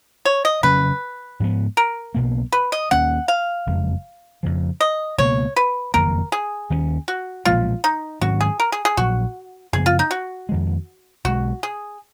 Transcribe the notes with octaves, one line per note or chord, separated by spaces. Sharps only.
C#5
D#5
F2 C#3 F#3 C#4 B4
G#2 F3 B3
A#4
B1 B2 A#3
B4
D#5
D#2 D#3 A#3 C#4 F#5
F5
F#1 F2 C#3 G#3
F2 C#3 F3
D#5
C#2 B2 A#3 C#5
B4
F#1 F2 D#3 A#3 A#4
G#4
D#2 D#3 A#3 C#4
F#4
B1 A#2 F3 G#3 F4
D#4
G#2 D#3 F#3 C#4 F#4
G#4
A#4
G#4
G#4
A#1 A#2 F#3 F#4
F#2 C#3 F3 B3 G#4
F4
D#4
F#4
F2 D#3 G#3
B1 B2 G#3 F#4
G#4